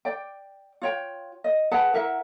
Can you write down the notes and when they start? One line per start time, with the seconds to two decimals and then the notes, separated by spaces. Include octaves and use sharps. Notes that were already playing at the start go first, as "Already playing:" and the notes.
0.05 D5 G5
0.82 F4 C#5 G5
1.44 D#5
1.71 G#4 B4 F#5 A5
1.94 E4 A#4 E5 F#5